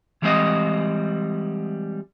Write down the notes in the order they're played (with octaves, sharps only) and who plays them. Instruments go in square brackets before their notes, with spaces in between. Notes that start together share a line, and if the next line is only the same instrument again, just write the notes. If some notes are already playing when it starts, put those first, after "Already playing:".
[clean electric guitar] E3 G3 G#3 C4 F#4 D#5